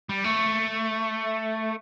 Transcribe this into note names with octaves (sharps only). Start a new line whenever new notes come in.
G3
A3